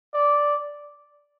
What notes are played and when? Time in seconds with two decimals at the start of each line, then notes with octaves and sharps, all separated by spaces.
0.13 D5